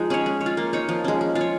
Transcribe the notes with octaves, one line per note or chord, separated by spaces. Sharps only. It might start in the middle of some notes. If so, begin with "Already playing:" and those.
Already playing: F3 G#3 D#4 F4
C#4 G#4 C#5
G#3
C#5
F4
A#3
D#4 C#5
F3
G#3 C#4
G#3
F4
C#5